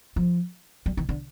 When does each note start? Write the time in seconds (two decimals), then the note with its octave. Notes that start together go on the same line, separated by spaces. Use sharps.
0.16 F3
0.86 G3
0.97 D#3
1.09 D3